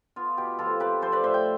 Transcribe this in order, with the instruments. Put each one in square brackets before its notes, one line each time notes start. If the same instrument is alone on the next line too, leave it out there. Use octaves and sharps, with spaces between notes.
[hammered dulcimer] B3 F4
B2 G4
F3 F4 A4
C3 G4 B4
F3 A4 C5
B4 D5
A2 C5 E5
E5 G5